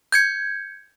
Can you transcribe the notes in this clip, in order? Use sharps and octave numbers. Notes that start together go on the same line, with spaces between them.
G6 G#6 C#7